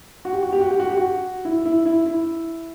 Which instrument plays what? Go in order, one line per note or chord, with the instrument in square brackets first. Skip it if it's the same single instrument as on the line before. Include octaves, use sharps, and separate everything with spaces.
[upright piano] F#4
G4
F#4
G4
F#4
G4
F#4
G4
F#4
E4
E4
E4
E4